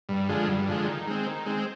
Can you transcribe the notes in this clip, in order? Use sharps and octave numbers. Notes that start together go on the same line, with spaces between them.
G2
D3 F3 G#3
G2
D3 F3 G#3
D#3
G#3 C4
D#3
G#3 C4